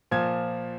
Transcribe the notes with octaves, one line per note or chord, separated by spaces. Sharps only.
A#2 F3 G#6